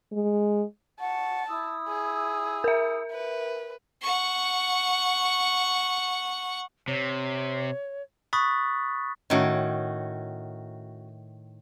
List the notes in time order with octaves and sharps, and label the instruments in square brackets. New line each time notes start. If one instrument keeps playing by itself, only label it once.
[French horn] G#3
[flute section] F#5 C#6 [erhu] A5
[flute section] E4 D#6 E6
[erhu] G#4
[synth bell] A#4 E5
[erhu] B4
[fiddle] F#5 C#6
[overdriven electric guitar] C3 [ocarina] C#5
[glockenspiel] B5 C#6 D#6 F#6 A6 B6
[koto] A2 D#3 [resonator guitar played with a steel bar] C#4 F#4